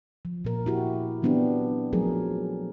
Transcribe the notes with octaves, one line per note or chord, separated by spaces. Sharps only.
F3
A#2 A#4
E4 F#4 G4
E3 F#3 B3 C4 D4 G4
F3 F#3 A3 G#4 A#4